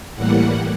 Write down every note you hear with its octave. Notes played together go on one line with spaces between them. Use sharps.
A2 E3 G3 A#3 F#5